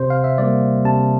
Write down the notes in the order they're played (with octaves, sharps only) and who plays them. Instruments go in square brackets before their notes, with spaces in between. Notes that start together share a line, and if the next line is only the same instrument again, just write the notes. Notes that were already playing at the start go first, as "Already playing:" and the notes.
Already playing: [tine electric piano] C3 C5
F5
E5
G3 A#3 D5
C3 A5